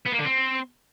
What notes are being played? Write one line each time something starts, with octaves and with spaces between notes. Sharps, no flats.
B3
A#3
D3
C4